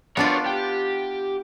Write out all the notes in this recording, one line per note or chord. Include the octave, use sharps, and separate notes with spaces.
B3 D4 F4 A#4 C#5
G4